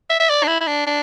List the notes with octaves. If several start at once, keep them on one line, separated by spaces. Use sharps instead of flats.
E5
E5
D5
D4
E4
E4
D4
D4